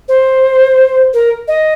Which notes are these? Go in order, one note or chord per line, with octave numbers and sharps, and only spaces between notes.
C5
A#4
D#5